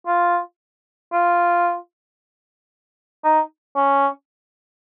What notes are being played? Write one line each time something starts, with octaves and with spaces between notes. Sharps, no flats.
F4
F4
D#4
C#4